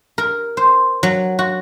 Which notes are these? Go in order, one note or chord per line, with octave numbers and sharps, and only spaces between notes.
A#4
C5
F#3
F#4